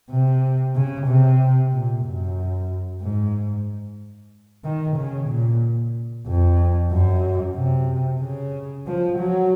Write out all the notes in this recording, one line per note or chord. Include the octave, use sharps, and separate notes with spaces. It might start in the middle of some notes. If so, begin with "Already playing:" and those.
C3
C#3
C3
A#2
F#2
G#2
D#3
C#3
A#2
F2
F#2
C3
C#3
F3
F#3